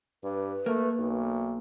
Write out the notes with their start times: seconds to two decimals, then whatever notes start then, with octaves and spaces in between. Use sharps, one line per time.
0.24 G2 B4
0.66 A3 A#3
0.99 B1